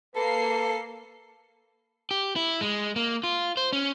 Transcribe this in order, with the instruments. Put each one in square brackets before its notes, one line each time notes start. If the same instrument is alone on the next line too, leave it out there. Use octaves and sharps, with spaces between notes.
[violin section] A#3 C7 [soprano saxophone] A4 [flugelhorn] B4
[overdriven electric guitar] G4
E4
G#3
A#3
F4
C5
C#4